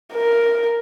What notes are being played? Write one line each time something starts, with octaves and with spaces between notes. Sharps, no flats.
A#4